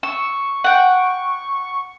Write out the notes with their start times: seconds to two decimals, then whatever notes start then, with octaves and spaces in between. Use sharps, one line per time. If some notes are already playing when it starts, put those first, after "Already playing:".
0.03 C#6 E6
0.64 F#5 G5